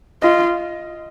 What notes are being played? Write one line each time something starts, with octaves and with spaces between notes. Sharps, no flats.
F4 D#5